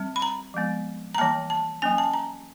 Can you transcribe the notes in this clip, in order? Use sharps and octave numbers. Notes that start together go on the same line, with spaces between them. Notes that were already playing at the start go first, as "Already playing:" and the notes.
Already playing: G3 C4
B5
A#5
F3 G#3 B3
A#5
E3 G3 A#3 A5
A5
F#3 A#3 C#4 G#5
A5
A#5